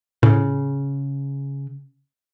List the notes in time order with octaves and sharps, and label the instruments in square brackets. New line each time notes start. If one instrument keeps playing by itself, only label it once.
[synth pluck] A2 [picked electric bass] C#3